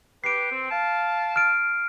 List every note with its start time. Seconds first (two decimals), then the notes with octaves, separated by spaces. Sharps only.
0.24 G4 B4 C7 D7
0.52 C4
0.71 F5 A5
1.36 F6 D7